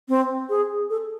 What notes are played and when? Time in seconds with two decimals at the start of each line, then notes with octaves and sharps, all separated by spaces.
0.08 C4
0.49 G#4
0.90 A4